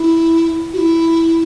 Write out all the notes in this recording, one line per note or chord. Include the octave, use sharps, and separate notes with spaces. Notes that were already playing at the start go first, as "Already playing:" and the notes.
Already playing: E4
F#4
E4